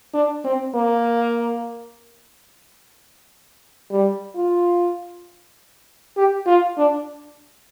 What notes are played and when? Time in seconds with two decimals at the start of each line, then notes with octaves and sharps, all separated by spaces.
0.14 D4
0.44 C4
0.74 A#3
3.91 G3
4.36 F4
6.17 G4
6.47 F4
6.77 D4